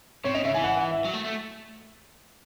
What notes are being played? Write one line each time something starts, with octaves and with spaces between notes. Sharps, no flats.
C3 C#5
C#3 D#5
C#3 E5
E3 G#5
F#5
F#5
E5
F#3
A3
A3